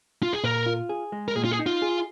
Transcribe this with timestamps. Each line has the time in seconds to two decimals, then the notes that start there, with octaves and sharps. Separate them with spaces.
0.23 F4
0.33 G#4
0.44 A#2 A#4
0.66 F4
0.89 G#4
1.12 G#3
1.28 A#4
1.36 A#2 G#4
1.45 F4
1.52 G#4
1.59 D#4
1.66 F4
1.82 G#4